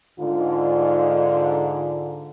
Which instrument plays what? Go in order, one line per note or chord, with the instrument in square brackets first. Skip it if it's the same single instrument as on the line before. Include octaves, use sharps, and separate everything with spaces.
[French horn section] G#2 D3 [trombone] F4